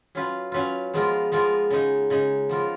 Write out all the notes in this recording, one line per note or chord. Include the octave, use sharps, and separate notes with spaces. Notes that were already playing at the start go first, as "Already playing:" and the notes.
F#3 C#4 F4 B4 F5
F#3 C#4 F4 B4 F5
F3 G#3 B3 F4 A#4
F3 G#3 B3 F4 A#4
C#3 G#3 D#4
C#3 G#3 D#4
F3 B3 F4 A#4